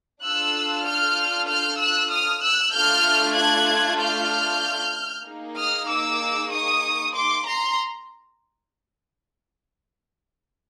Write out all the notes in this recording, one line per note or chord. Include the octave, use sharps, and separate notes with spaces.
D4 F4 A4 E6 F#6
F6 G6
F6 G6
E6 F#6
D#6 F6
E6 F#6
A3 D4 F4 A4 F6 G6
F#6 G#6
F6 G6
A#3 D#4 G#4
D#6 F6
D6 E6
C#6 D#6
C6 D6
A#5 C6